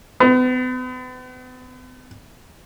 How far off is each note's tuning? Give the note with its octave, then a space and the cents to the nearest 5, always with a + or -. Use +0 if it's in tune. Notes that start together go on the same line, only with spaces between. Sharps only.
B3 +40